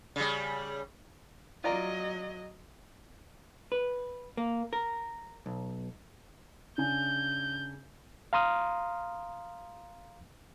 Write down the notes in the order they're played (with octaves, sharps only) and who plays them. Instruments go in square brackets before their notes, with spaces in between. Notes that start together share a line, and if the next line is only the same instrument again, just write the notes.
[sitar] C#3 G3
[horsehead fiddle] F#3 D#5 [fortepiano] F4 D5 A#5
[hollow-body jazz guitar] B4
A#3
A#4
B1
[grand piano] C#3 D4 G#5 [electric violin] G6
[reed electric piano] F5 A#5 C6 D#6 F6